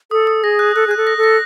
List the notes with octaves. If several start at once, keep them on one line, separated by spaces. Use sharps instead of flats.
A4 D#6
D#6
G#4 A#6
F#6
A4 F#6
G#4 F#6
A4
A#6
A4
A#6